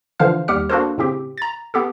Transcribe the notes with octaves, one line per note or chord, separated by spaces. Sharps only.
D3 E3 F3 C5 F5 F6
D#2 G3 G4 F#5 F6
A#3 D4 F#4 A4 A#4 C5
A2 C#3 C4 G4
A#5 A6
B3 G4 A4